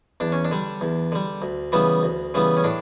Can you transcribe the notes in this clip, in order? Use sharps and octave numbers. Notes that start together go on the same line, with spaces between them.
E2 D4
C#4
D4
D3 G3
E2
D3 G3
D2
C#3 E3 G3 B3
D2
C#3 E3 G3 B3
C#4
A2 D4